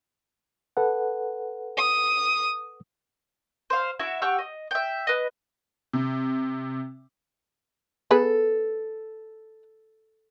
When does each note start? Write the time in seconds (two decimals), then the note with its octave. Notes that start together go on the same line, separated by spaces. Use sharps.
0.77 A4 B4 F#5
1.77 D#6
3.70 C5 F5
3.99 E4 F#4 E5
4.22 G4 F#5 C#6 E6
4.39 D#5
4.71 E5 G5
5.07 B4 D#5
5.93 C3
8.11 B3 G#4 A4 B4